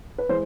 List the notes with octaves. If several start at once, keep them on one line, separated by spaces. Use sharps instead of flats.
B4
E3 G#3 C5